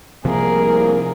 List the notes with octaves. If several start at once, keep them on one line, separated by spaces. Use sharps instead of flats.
C2 C3 F3 A#3 G#4 A#4